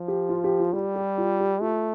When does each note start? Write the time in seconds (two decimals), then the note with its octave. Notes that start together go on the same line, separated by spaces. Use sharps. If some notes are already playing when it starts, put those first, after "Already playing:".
Already playing: F3
0.08 G4
0.29 F4
0.44 G4
0.59 F4
0.73 G3 G4
0.96 G4
1.18 F4
1.40 G4
1.61 A3 F4